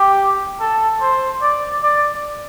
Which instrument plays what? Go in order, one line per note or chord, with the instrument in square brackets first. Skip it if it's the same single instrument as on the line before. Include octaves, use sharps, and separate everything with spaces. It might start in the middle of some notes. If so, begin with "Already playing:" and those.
Already playing: [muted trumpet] G4
A4
C5
D5
D5